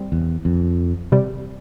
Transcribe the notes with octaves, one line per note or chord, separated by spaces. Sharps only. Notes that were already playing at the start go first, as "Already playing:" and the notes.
Already playing: G3 C4
E2
F2
C3 G3